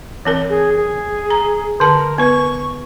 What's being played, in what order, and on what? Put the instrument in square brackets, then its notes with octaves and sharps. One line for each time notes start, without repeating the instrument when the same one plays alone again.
[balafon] E3 C4 A#4
[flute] G#4
G#4
[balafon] A#5
[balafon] D3 A5 [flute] A#4
[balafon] B3 B4 [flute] C#6